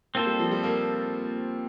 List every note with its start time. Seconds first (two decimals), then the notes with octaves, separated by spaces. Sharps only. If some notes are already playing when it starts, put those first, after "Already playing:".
0.15 A#3 C4 F4 A4 C5
0.27 G3
0.39 F3
0.51 G3
0.63 A#3